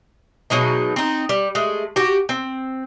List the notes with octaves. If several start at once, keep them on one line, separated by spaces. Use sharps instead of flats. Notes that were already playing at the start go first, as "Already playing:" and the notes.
B2 F#3 G#3 D#4
C4 D#4
G3
G#3 A3
F#4 G4
C4